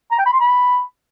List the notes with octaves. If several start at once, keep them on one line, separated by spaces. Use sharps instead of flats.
A#5
G5
B5
C6
B5